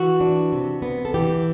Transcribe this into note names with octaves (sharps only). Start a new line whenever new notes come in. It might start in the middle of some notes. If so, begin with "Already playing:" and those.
Already playing: E3 F#4
D4
C3
B3
A4
E3 G4